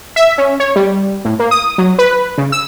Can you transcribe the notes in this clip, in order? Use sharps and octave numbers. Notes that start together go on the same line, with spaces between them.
E5
C#4
C#5
G3
A2
A#3
D#6
F#3
B4
C#3
E6